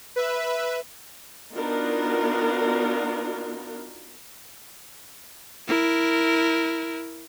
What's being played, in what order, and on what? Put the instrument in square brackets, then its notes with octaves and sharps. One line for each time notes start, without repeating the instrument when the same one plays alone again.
[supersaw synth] B4 E5
[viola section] B3 D4 D#4 F4 F#4 A#4
[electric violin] E4 A#4